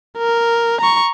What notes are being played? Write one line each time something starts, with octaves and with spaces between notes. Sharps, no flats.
A#4
A#5 C#6